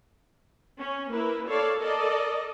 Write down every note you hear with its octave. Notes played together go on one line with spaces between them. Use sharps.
C#4
A#3 E4 A#4 B4
A4 C#5 D5 F5
A4 A#4 D5 D#5